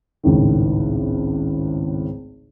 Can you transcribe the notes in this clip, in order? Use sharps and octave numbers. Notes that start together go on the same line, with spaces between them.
G#1 C#2 A2 D#3